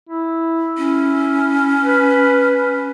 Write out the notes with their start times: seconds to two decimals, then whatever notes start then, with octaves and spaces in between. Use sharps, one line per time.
0.09 E4
0.78 C#4 E4
1.84 B4